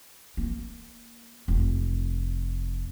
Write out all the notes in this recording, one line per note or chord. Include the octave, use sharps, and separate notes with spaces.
A#3
F1